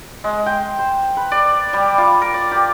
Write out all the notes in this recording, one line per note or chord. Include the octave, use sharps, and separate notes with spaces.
G#3
G5
C5
B4
D5
G3
F4
A#4
D5
G4